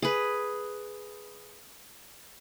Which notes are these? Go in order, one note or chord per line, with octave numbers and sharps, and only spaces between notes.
G#4 B4